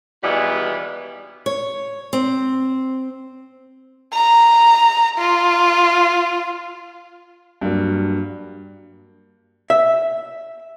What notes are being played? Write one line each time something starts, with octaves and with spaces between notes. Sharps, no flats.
D#2 B2 E3 G3 G#3 B3
C#5
C4
A#5
F4
G2 F#3 A#3
E5